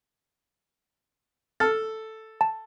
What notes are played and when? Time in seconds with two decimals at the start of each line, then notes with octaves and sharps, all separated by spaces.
1.60 A4 A5 F6 A6
2.41 A5